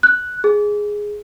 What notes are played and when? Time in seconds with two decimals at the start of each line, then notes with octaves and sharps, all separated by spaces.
0.03 F#6
0.44 G#4